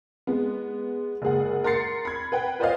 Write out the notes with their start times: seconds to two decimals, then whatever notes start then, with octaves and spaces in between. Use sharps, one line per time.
0.27 G#3 B3
1.22 F#1 G#3 G#4 F#5
1.64 A#4 C6 A6 C7 C#7
2.05 B5 G#6
2.32 B4 F#5 G5
2.59 F4 B4 C5 D5 D#5 F5